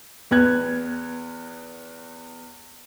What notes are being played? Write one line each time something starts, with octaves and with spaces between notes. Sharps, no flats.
E2 B3 F#6 G#6